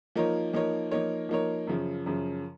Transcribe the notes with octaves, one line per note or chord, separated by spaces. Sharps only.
F3 A#3 D#4 A#4 C#5
F3 A#3 D#4 A#4 C#5
F3 A#3 D#4 A#4 C#5
F3 A#3 D#4 A#4 C#5
F#2 C#3 F3
F#2 C#3 F3